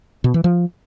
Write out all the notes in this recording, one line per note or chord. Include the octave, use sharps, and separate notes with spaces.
B2
E3
F3